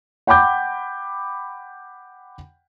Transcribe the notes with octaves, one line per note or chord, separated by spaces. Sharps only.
F#5 G5 B5 D6 G6